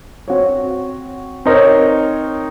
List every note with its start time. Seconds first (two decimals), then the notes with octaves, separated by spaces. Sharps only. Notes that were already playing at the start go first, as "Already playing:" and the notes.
0.28 C4 F#4 C#5
1.45 C4 D#4 A#4 C#5